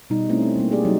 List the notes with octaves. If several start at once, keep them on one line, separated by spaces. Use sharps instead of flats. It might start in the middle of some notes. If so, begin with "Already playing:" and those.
B2 G3 D#4
A3 C4 C#4 E4
C4
G3 A#3
A#3 G4 G#4 D5
F#3 G3 D#4